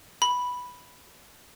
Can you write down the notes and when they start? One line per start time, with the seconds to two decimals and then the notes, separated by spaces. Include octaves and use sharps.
0.22 B5